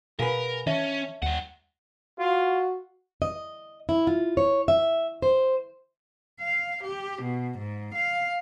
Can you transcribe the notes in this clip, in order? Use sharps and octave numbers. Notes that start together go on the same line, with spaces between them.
B2 G#4 A#4 B4 F5 F#5 G#5
E3 C#4 C#5 D#5 E5 A5
D#2 G3 F#5
F4 F#4
D#5
E4
F4
C#5
E5
C5
F5
G4
B2
G#2
F5